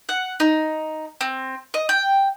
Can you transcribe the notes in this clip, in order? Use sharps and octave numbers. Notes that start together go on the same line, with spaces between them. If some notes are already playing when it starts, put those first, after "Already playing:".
F#5
D#4
C4
D#5
G5